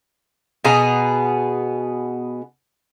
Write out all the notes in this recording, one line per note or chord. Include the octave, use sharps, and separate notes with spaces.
B2 B3 G#4 A#5